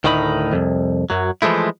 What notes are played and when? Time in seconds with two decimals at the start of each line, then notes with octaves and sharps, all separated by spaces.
0.04 D2 A2 D#3 D#4 B5
0.53 C2 F2
1.10 F#2 F#3
1.42 E3 F3 G#3 A3 E4